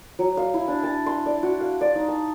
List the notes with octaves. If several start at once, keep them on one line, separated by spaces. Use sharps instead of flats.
F#3
F5
E4
D4
A5
C6
D5
F#4
F5
D5
D#4
A5